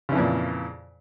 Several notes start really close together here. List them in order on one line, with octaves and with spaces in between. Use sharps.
C#3 E3 F2 A#2